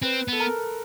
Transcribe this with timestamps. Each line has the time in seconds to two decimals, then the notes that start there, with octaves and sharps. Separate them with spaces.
0.02 C4 B4
0.28 B3 A4
0.40 A#4